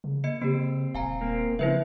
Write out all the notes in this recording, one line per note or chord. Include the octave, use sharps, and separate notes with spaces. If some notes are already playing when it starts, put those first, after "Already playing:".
C#3
A#3 D#5 C#7
C#3 A#3 C4 G4
D#1 F5 G#5 A#5
A#3 C4
C#3 F3 C4 E4 B4 E5